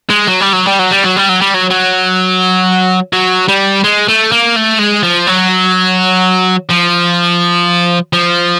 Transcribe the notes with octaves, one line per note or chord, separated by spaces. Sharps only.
G#3
F#3
G3
F#3
G3
F#3
G3
F#3
G3
F#3
G3
F#3
F#3
F#3
G3
G#3
A3
A#3
A3
G#3
F3
F#3
F3
F3